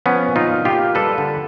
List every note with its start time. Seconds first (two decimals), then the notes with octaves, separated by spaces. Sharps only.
0.06 F3 B3 C#4
0.28 A#2
0.36 D#4 F4
0.50 A#2
0.65 F4 G4
0.73 A#3
0.95 G3 A4 B4
1.18 D3